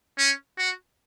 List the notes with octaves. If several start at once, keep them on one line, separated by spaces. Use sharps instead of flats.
C#4
F#4